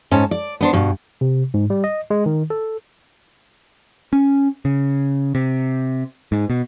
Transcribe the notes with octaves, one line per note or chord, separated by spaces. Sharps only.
G#2 C#4 A5
D5
B3 D4 C5
G2 B2
C3
G#2
G3
D#5
G#3
D#3
A4
C#4
C#3
C3
G#2
B2